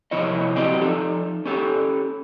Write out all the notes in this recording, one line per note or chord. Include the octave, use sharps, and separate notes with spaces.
C3 F3 E4 C#5 D#5
F#3 C4 G4 D5 D#5
F3 D#4 A4
C#4 G4 A4